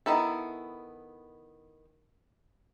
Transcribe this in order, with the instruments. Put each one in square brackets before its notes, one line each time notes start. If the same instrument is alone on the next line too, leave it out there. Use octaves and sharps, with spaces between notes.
[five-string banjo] D#3 B3 E4 A4